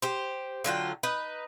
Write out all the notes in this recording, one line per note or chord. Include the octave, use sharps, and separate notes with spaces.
G4 C5
D3 F#3 F4 G5
D#4 B4